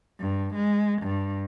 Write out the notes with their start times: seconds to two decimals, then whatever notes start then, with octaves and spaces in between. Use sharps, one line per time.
0.19 G2
0.54 G#3
1.02 G2